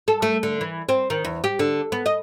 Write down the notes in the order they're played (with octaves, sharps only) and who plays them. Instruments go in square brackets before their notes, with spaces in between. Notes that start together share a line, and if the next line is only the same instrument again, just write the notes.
[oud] A4
A3
D3
E3
C4
D#3
E2
G4
D3
B3
D#5